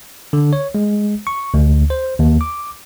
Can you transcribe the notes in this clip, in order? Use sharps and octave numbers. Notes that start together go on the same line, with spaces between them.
D3
C#5
G#3
C#6
D2
C5
D#2
D6